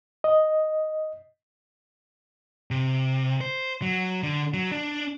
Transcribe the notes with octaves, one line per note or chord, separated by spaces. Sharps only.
D#5
C3
C5
F#3
D3
F#3
D4